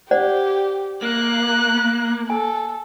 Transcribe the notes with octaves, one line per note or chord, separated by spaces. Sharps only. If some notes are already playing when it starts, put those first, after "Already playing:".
G4 C5 D5 F#5
A#3 F#6
A4 G#5